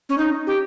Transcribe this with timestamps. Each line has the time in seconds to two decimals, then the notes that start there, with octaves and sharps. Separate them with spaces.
0.09 C#4
0.18 D#4
0.47 G4